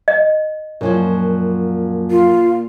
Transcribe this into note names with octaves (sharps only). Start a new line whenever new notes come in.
D#5
F#2 A#2 F3 F#3
F4